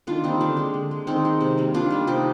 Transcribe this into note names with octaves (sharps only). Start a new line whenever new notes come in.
D#3 D4 F4
G3 A#3 C4 D#4
D3 D4
G#3
D3
G#3
D#3 C4 D#4
G#3
C3
G3 A#3
D#3 D4 F4
G3 A#3
C3 D#4 G4